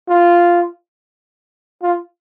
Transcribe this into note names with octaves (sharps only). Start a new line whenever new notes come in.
F4
F4